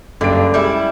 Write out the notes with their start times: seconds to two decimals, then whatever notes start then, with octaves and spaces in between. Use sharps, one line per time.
0.21 F#1 G2 D3 D7
0.54 G3 G#3 E4